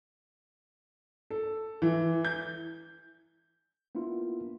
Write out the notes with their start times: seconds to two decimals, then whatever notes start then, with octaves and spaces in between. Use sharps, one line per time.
1.31 A4
1.82 E3
2.25 G6
3.95 A#3 B3 D4 E4 F4